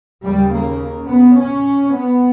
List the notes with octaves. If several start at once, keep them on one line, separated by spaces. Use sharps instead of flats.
D#2 C#3 G3
A#3
B3
C#4
B3